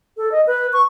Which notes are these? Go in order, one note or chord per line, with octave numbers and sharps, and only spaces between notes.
A4
D#5
B4
C#6